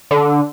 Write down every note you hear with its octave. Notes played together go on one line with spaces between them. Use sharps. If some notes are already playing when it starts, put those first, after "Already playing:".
D3